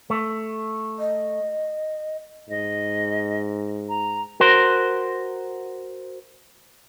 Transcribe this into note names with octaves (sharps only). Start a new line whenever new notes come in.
A3
D#5
G#2 D#5
A#5
F#4 A#4 C5